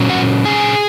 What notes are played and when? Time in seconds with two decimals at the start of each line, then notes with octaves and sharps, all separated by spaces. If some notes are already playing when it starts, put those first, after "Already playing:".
Already playing: A#2 F#3 C#4
0.10 F#4 F#5
0.45 G#4 G#5